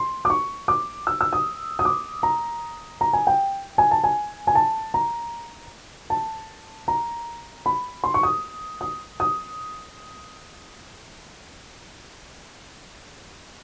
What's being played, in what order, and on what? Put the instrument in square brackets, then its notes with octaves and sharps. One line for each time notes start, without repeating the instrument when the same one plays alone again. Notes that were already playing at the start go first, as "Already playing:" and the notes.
Already playing: [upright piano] C6
D6
C#6
D6
E6
E6
D#6
D#6
D6
A#5
A#5
G#5
G5
G#5
A5
G#5
G#5
A5
A#5
A5
A#5
B5
C6
C#6
D#6
D#6
D#6